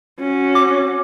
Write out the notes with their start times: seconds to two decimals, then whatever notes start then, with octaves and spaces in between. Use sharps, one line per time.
0.20 C#4 F#4
0.55 D6